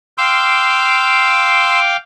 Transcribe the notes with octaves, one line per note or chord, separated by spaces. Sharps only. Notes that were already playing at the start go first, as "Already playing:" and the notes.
F5 G5 C6 D6 E6